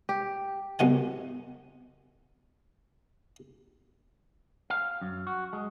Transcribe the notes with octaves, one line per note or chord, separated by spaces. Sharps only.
G4
C2 B2 F#5 G#5
F5
F#2
F#4
G#3